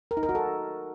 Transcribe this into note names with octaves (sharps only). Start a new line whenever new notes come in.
A#4
D#4
A#4
F#4
A4